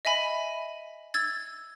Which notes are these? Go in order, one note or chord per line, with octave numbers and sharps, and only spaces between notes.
D#5 E5 G#5 B5
E6 G#6 A6